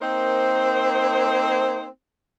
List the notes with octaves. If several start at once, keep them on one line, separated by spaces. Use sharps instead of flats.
A#3 C4 D#4 A#4 C5